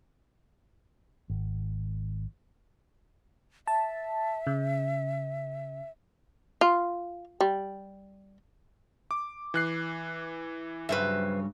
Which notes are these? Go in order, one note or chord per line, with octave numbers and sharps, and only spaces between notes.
G#1
E5 A5
C#3
F4
G3
D6
E3 F#6 C7
G2 C#3 F#3 B4 C5 E5